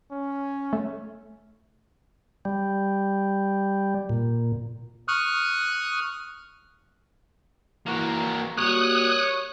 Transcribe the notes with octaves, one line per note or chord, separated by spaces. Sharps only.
C#4
A3
G3
A#2
C#6 D#6 F6 F#6
E3 A#3 F#4
G3 A#3 F#4 C#5 D#6 F#6